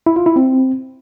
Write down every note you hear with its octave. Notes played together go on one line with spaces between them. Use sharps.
E4
F4
E4
C4